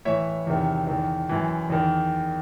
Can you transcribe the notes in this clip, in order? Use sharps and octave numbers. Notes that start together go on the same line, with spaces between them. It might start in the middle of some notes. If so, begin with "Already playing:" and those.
A2 E3 C#5 E5
E2 C3 D#3
E2 D#3
F#2 E3
E2 D#3